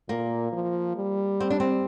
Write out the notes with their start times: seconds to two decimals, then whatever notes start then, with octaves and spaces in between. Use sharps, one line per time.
0.09 A#2 A#3
0.52 F3
0.96 G3
1.40 C4
1.50 D4
1.60 C4